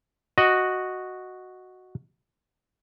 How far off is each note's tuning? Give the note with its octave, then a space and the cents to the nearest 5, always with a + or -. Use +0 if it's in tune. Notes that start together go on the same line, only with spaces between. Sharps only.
F#4 +0 D#5 +0